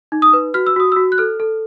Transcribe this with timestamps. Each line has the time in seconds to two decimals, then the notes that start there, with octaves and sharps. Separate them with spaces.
0.12 D#4
0.22 D#6
0.33 B4
0.54 F#4 F6
0.67 E6
0.76 F#4 D#6
0.92 E6
0.96 F#4
1.12 F#6
1.18 A4 F6
1.40 A4